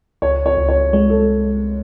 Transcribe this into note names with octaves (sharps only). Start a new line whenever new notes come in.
C#2 C#5
C#5
C#2
C#5
G#3 C#5
A4